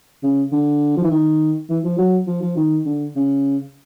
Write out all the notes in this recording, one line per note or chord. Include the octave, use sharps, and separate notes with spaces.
C#3
D3
F3
E3
D#3
E3
F3
F#3
F3
F3
D#3
D3
C#3